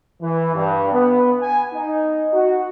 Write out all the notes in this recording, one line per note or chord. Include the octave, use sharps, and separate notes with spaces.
E3
G2
B3
G#5
D#4
F#4